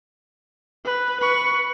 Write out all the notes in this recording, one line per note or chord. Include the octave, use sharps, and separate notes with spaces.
B4
B4 C#6